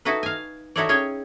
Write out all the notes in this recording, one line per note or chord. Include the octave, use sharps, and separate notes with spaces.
D#4 E4 F#4 A4 B4
F5 G#5
D#4 E4 F#4 A4 C#5 D5
C#4 G#4 C#5 G5